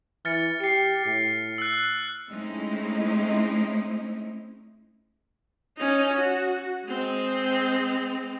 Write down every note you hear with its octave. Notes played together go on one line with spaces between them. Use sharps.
E3 F6 A6 C#7
G4 C7 C#7
A2
E6 F#6
G#3 A3 C4 C#4 D#4 E4
C#4 D#4
F#4
G#3 C4